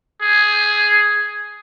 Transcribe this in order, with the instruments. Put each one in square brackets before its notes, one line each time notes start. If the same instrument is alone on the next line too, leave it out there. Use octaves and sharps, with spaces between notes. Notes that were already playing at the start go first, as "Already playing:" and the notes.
[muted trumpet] G#4